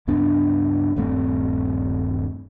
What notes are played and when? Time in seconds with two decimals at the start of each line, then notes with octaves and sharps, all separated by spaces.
0.07 C#2 G2 B3 D4
0.96 D#1 G2 A3 C4